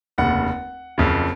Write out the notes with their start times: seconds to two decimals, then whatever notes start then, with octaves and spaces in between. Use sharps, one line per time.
0.18 F1 D#2 C#3 F#5
0.98 F#1 F2 C#3